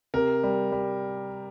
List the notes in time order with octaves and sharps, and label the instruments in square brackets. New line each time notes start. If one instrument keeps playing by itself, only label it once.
[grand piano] C3 A#4
G3
G3